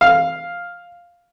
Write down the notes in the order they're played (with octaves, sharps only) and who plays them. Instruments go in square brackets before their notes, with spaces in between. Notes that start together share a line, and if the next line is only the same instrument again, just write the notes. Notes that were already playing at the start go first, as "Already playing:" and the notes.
[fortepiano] F5